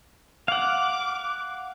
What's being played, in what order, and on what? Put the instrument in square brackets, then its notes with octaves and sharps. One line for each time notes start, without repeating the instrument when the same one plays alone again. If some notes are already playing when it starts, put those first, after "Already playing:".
[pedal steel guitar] F5 F#5 [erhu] D6